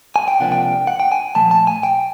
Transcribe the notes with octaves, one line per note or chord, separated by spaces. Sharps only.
G#5
G5
C#2 C3 F3 A#3 D4 F#5
G5
F#5
G5
G#5
A#2 F3 A3 A5
A5
G#5
G5